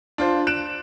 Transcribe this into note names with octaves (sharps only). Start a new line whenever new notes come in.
D4 F4 C5
F#6 D7 E7